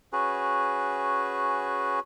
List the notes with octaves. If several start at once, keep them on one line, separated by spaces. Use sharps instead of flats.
C#4 F#4 G#4 B4